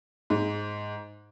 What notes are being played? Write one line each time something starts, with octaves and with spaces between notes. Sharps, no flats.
G#2